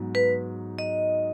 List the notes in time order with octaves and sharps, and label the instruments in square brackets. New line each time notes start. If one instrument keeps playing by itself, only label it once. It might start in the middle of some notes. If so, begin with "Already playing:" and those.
Already playing: [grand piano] G#2 F#3 B3
[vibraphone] B4
D#5